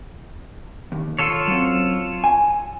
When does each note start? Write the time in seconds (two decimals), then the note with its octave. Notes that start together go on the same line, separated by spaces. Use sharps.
0.92 D#2
1.19 F4 A4 C#5
1.48 F#2 C4
2.24 G#5